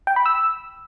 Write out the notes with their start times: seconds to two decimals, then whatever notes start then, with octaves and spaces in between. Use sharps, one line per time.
0.07 G5
0.16 B5
0.26 E6